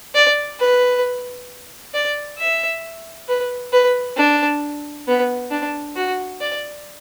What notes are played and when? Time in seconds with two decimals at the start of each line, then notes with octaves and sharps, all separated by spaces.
0.15 D5
0.60 B4
1.94 D5
2.39 E5
3.29 B4
3.73 B4
4.17 D4
5.07 B3
5.51 D4
5.96 F#4
6.41 D5